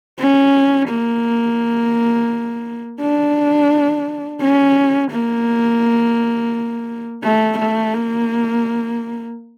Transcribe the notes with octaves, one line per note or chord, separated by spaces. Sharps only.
C#4
A#3
D4
C#4
A#3
A3
A3
A#3